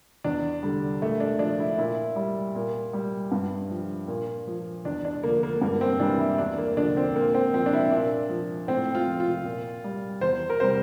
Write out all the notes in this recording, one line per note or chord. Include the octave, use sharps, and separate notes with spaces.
E2 D4
D3 G3
A#2 A3
D4
F3 D4
E4
A#2 E4
G3
A#2
G3
G2
F3
A#2
F3
E2 D4
D4
D3 F3 A#3
A#3
G2 A#3
C4
E3 G3 D4
E4
E2 D4
A#3
D3 F3 D4
C4
A#2 A#3
C4
F3 C4
D4
E4
A#2 D4
F3
A2 C4
F4
F3
F4
A#2
G3
E2 C5
A#4
C3 G3 C5